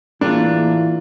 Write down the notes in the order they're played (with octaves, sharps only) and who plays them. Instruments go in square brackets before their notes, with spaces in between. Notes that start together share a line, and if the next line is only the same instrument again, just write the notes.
[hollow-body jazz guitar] A2 F4 [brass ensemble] E3 [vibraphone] A#3 G#4 [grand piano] D4